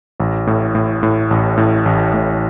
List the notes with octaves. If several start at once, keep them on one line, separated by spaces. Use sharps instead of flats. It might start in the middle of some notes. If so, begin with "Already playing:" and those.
A1
A2
A2
A2
A1
A2
A1
A2